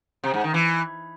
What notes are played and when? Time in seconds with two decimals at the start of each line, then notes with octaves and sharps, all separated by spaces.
0.24 C3
0.34 G#2
0.44 D#3
0.54 E3